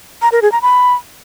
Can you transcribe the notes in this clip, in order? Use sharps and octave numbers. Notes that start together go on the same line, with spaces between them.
A#5
A#4
G#4
A#5
B5